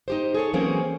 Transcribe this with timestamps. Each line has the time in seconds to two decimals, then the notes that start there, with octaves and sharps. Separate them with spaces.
0.08 D#4 G4 C5
0.34 G#4 A4 C#5
0.53 E3 F#3 A#3 C4 C#4 G#4